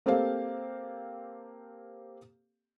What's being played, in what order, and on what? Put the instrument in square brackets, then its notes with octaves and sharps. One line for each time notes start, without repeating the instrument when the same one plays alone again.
[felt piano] A#3 C4 G4 A4 C5 F5